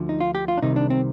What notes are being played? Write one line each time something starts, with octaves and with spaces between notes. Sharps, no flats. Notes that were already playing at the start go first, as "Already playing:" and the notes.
Already playing: D2 D3 F3
D#4
F4
G4
F4
D4
C2 C3 D#3 D#4
D4
C4